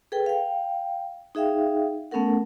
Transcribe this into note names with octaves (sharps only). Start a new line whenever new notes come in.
G#4 A4 B4 G5
F5 G5
D#4 G#4 E5 F5 G5
A3 B3 C#4 A4 A#4 F#5